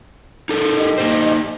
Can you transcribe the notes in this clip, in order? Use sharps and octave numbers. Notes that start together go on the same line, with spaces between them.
D#4 A4 A#4
G4 D#5
A#3 D#4 C5